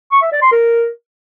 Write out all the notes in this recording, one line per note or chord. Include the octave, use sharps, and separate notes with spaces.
C#6
E5
D5
C6
A#4